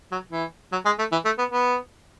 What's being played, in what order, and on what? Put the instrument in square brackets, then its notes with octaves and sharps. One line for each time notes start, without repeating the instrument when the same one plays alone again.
[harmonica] F#3
E3
F#3
G#3
A3
E3
A3
B3
B3